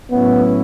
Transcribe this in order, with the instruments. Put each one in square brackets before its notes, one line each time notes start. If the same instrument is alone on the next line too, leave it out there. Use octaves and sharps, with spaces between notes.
[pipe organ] A2 F#3 C#4 E4 [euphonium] B3